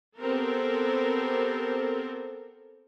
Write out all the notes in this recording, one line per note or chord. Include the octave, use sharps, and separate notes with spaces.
B3 C4 G4 A4 A#4